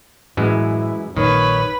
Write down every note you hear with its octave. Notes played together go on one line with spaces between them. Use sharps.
F#2 A2 E3 G#3 E4
A#1 F#2 A#2 D#3 B4 C#5